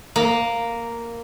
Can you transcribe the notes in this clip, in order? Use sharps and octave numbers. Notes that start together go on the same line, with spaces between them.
A#3